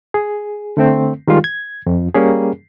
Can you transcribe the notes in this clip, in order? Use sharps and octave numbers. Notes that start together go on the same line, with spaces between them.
G#4
D3 A3 C4
D#3 G3 G#3 F4
G#6
F2
G3 A#3 C#4 G#4